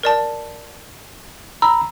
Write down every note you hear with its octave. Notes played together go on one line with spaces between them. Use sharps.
A#4 D5 A5
A#5 B5 E6